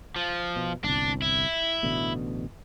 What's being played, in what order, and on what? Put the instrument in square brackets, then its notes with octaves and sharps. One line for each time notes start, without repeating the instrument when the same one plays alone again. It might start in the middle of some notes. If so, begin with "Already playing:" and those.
[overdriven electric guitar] F3
[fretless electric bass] B2
[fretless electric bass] G1 C2 [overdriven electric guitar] D4
[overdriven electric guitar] E4
[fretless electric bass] A1 B2 D3